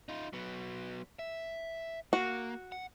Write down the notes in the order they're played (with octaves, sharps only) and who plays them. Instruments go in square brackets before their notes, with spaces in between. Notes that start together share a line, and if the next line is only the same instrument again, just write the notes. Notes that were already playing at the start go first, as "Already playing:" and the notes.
[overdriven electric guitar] D#4 F4
F#3 B3
E5
[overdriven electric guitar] A#3 [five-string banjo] F#4
[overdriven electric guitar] F#5